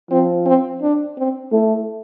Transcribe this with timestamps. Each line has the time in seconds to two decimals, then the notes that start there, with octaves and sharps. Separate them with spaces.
0.11 F3 C4
0.46 C4
0.82 D4
1.17 C4
1.52 A3 E4